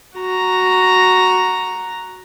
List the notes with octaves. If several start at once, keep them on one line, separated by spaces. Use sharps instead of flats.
F#4 A#5